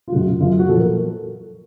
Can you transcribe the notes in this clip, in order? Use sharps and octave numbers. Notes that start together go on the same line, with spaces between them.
F4
F#2 C#3 F#3 F#4
F4
F#2 C#3 F#3 F4
F#4
A#2 F3 A4
A#4